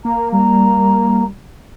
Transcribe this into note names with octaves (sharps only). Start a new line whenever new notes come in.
A#3 A#5
G3 A#5